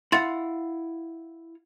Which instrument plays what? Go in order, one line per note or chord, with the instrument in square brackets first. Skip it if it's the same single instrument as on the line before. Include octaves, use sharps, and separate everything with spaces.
[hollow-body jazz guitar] E4 F5 F#5 [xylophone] C6 A6